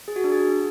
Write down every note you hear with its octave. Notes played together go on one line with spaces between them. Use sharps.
G#4
F#4
D4
G#4